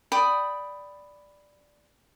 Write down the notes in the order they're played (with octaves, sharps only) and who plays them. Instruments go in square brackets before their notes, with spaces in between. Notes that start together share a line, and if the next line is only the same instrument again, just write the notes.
[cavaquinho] D5 G5 B5 D#6